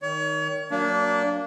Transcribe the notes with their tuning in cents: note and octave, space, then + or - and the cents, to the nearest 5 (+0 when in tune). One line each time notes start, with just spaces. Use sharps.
D#3 +0 C#5 +35
F#3 +0 A#3 -15 D4 -20